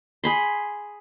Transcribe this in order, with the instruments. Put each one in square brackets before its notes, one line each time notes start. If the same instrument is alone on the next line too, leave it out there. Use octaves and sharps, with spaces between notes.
[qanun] G#4 B5 C6